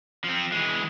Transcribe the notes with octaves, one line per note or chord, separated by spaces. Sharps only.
F3 C4
E3 G#3